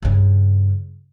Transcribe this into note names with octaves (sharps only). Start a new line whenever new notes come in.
G2 C#3